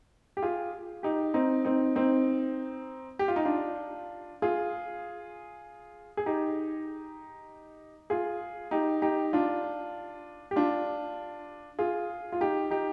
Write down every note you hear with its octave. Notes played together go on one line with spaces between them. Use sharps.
G4
F4 G#4
D#4 G4
C4 D#4
C4 D#4
C4 D#4
G4
F4
D#4
D4 F4
F4 G#4
G#4
D#4 G4
F4 G#4
D#4 G4
D#4 G4
D4 F4
G4
D4 F4
F4 G#4
F4
D#4 G4
D#4 G4